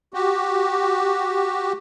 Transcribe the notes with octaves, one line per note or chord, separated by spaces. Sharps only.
F#4 G4